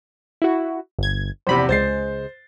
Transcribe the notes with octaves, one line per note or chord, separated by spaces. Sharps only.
E4 F#4
G1 G#6
A#1 E2 C3 C5 B5
C#2 G#3 C5 A6 C7